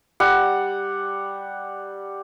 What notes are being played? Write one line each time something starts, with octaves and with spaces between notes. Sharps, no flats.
G3 F#5